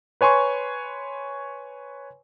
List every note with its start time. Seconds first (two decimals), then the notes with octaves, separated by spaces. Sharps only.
0.21 B4 C#5 G#5 C6 C#6